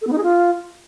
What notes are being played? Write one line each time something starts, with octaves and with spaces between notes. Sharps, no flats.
A4
B3
D#4
G#4
F4